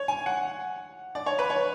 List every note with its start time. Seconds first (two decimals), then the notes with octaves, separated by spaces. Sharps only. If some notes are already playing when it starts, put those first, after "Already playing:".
Already playing: C#5
0.08 G#5
0.26 F#5
1.15 D5
1.26 C#5
1.39 B4
1.50 C#5